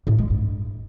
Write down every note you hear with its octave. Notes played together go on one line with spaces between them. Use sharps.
A2
G#3
G2